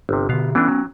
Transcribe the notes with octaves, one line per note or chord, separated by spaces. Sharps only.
G1 C3
B2 D3 B3 F5
E3 A3 B3 C#4 D4
F#3